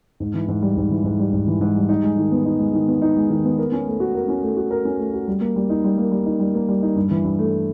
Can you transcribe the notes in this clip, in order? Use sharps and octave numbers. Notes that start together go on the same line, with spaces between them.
G#2
E3
G#2
G3
G#2
E3
G#2
G3
G#2
E3
G#2
G3
D#4
G#3
D#3
B3
D#4
G#3
D#3
B3
D#4
G#3
D#3
B3
A#4
C#4
A3
F#4
A#4
C#4
A3
F#4
A#4
C#4
A3
F#4
G3
A#3
G3
D#4
G3
A#3
G3
D#4
G3
A#3
G3
D#4
G2
E3
G2
A3